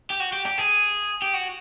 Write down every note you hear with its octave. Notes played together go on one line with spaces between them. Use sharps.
G4
F#4
G4
G4
G#4
G4
F#4